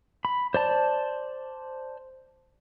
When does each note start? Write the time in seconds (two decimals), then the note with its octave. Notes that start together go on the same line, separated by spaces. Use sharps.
0.25 B5
0.54 C5 D5 A5